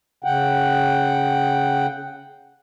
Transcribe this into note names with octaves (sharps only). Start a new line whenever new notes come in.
C#3 F#5 G5